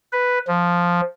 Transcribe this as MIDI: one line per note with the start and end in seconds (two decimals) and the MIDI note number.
0.12 0.39 71
0.48 1.01 53